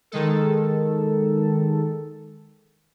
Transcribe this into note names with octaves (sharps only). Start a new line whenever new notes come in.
D#3 G#3 A4